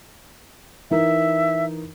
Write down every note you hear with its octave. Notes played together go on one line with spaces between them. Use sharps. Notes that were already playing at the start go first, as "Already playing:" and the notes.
E3 D#4 A#4 E5